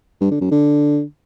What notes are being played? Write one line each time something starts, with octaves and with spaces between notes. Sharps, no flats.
G2
D3
F#2
D3